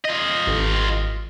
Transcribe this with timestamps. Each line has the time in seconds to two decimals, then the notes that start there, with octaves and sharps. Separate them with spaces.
0.05 F4 D#5
0.47 G#1